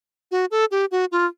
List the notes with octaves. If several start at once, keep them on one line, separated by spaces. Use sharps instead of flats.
F#4
A4
G4
F#4
F4